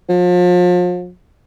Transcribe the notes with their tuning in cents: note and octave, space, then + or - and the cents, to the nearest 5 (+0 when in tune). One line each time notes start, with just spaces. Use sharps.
F3 +40